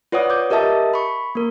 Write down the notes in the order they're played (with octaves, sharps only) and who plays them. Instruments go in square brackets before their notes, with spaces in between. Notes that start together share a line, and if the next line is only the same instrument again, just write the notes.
[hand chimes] F4 B4 C#5 D5 F#5 D#6
D6 G6
G4 A#4 D#5 E5 A5 D#6
B5 C#6
A#3 A#4